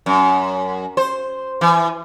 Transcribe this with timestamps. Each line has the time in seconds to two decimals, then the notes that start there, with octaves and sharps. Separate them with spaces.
0.06 F#2
0.97 C5
1.61 E3